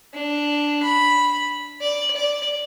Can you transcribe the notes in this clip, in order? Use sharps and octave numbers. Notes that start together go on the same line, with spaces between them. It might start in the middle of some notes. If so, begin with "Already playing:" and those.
D4
B5
D5
D5